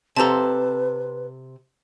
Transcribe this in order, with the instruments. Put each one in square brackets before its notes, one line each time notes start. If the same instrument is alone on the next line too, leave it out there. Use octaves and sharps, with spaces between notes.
[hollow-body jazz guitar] C3 C4 A4 [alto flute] B4 [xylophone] A5 A#5